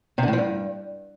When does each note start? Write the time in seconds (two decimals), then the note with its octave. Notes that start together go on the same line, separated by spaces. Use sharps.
0.18 C3
0.23 D3
0.28 A2
0.33 F3
0.38 G2